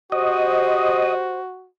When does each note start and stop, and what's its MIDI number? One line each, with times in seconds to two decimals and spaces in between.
0.12 1.68 66
0.12 1.40 67
0.12 1.40 72
0.12 1.15 75